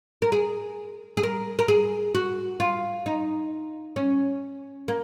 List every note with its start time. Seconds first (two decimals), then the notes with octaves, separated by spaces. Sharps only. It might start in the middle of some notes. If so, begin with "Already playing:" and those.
0.22 A#4
0.32 G#4
1.17 G#4
1.23 A#4
1.59 A#4
1.68 G#4
2.15 F#4
2.60 F4
3.06 D#4
3.96 C#4
4.88 A#3